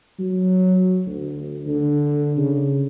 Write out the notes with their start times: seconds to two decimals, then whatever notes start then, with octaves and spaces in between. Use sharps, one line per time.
0.19 F#3
1.06 D2
1.67 D3
2.37 C#3